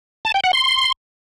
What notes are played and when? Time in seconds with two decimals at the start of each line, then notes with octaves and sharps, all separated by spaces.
0.25 A5
0.34 G5
0.44 F#5
0.53 C6